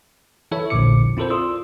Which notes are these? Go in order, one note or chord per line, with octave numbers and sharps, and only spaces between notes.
E3 E4 A4 C#5 E5
A#1 E2 A#2 D3 D6 C#7
C4 E4 F4 A4 A#4 C5
F4 D5 C6 D#6 E6